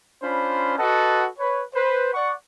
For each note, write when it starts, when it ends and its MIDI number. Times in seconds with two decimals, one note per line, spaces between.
0.22 0.76 61
0.22 0.76 62
0.22 0.76 65
0.22 0.76 72
0.22 0.76 83
0.79 1.27 66
0.79 1.27 69
0.79 1.27 71
0.79 1.27 75
0.79 1.27 78
0.79 1.27 81
1.39 1.63 71
1.39 1.63 73
1.74 2.12 71
1.74 2.12 72
2.14 2.33 74
2.14 2.33 78
2.14 2.33 85